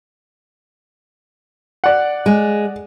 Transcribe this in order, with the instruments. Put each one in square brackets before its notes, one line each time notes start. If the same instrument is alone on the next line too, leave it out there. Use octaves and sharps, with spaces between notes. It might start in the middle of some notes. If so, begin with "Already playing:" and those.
[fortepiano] D5 F#5
[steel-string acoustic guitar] G#3